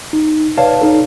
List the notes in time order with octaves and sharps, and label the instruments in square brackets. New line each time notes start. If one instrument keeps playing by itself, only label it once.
[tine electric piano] D#4
B4 C#5 D5 F5 A5
D#4 A4